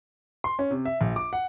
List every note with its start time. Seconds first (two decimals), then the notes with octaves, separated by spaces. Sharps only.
0.44 C6
0.59 C#4
0.71 C3
0.85 E5
1.01 A#1
1.16 D6
1.33 F#5